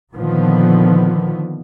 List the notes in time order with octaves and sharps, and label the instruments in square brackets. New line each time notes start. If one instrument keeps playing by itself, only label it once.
[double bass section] A#2 D3 D#3 F3 B3